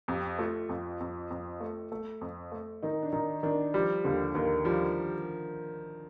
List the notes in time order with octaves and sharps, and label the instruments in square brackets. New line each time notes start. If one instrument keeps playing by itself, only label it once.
[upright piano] F2 [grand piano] G4
[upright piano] A3 [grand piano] F4
[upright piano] F2
F2
F2
A3
A3
F2
A3
[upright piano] D#3 [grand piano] D#4
[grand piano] D4
[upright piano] D#3 [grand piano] D#4
[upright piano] D#3 [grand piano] D4
[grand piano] F3 [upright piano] G3
[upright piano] D#2 [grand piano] D3
[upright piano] D#2 [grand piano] D#3
[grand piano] F3 [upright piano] G3